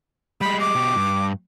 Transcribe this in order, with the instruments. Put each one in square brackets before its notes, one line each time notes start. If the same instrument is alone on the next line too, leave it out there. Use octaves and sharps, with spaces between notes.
[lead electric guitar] G3 G#3 [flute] B5
[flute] D6
[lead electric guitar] B2 G4
G2